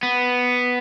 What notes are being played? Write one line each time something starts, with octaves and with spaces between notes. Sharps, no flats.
B3